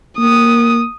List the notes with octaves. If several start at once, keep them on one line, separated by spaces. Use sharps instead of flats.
A#3 D#6